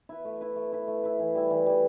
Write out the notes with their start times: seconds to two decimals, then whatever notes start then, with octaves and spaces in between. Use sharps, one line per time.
0.09 E4 B4
0.25 A3
0.41 E4 B4
0.56 A3
0.72 E4 B4
0.88 A3
1.03 E4 B4
1.19 E3
1.35 G3 E4
1.51 E3
1.66 G3 E4